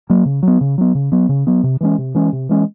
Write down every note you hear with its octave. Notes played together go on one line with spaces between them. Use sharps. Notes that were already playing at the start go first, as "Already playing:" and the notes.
F#3 A#3
C#3
F#3 B3
C#3
F#3 B3
C#3
F#3 B3
C#3
F#3 B3
C3
E3 G#3 C#4
C3
E3 G#3 C#4
C3
E3 G#3 C#4